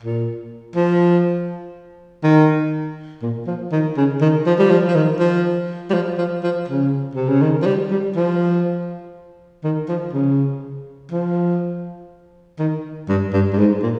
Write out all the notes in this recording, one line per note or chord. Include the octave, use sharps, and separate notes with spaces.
A#2
F3
D#3
A#2
F3
D#3
C#3
D#3
F3
G3
F3
F3
D#3
F3
G3
F3
F3
F3
C#3
C3
C#3
D#3
F3
G3
G3
F3
D#3
F3
C#3
F3
D#3
G2
G2
G2
G#2
A#2